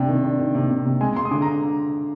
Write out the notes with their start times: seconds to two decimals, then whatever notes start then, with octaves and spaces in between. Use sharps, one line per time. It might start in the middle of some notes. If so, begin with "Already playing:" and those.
Already playing: C3 D4 G5
0.09 D#3
0.24 D4
0.39 D#3
0.55 C3
0.70 C3
0.86 C3
1.01 G#3 G#5
1.16 G#3 C6
1.25 D#6
1.31 D3 D6
1.42 A#5